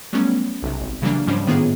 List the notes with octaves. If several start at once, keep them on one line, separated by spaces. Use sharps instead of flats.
F#3 G3 A3 B3 C#4
B1 C3
G#1
C#3 E3 F#3 G3 A#3 D4
G#2 F3 G3 C#4 D4
A2 D#3 A#3 B3 F4 G#4